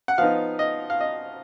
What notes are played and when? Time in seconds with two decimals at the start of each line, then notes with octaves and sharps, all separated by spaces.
0.08 F#5
0.18 F3 B3 D#4 F5
0.59 D#5
0.90 F5
1.01 D#5